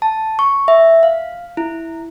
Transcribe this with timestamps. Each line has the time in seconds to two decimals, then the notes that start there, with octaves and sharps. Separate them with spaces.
0.02 A5
0.39 C#6
0.68 E5
1.03 F5
1.57 E4